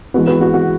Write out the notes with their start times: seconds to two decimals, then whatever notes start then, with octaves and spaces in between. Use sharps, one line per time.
0.14 E3 G#3 B3 F#4 B4
0.27 F#4 B4
0.41 F#4
0.54 F#4